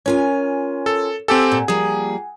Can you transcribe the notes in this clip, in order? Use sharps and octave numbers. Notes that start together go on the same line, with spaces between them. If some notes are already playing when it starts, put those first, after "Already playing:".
C#4 F4 A#4 C#5 G#5
A4
C4 G4 A4 F#5 G#5
A#2
F3 G3 A#3 G#4